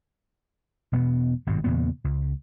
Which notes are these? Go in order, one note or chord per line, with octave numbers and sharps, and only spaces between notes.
E1 B2 B3
G#1 G2 B2
E2 A#2 C#3 B3
C#2